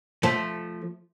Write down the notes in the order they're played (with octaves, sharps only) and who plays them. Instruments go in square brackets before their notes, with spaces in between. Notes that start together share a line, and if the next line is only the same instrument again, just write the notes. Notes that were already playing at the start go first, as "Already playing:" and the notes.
[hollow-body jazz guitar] F3 A3